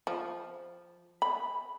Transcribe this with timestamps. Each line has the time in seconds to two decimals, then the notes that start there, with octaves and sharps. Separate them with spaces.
0.07 F3
1.22 B5